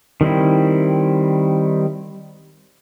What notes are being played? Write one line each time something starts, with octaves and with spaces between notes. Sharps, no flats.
D#3 G3 C4 E4